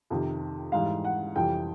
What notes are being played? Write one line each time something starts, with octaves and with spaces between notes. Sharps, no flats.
F2 C3 D#3
G#2 E3 G3 F5
F#5
F2 C3 E3 G3 G5